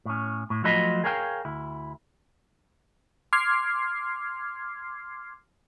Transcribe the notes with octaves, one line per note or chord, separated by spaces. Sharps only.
A2 C#4
A2
F3 F#3 A3 F4 D#5 B5
G#4 A#4 C#5 F5 G5
D2 E4
C6 D6 F6 G#6 C7